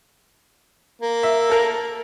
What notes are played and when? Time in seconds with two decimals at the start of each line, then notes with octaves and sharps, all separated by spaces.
1.02 A#3
1.23 E5
1.50 A4 A#4